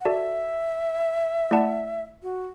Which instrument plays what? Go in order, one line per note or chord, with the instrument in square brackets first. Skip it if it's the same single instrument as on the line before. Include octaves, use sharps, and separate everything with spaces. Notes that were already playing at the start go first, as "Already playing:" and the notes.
[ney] F#5
[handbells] F#4 A4 D5 A5 [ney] E5
[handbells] A3 E4 D5 F#5 A5
[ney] F#4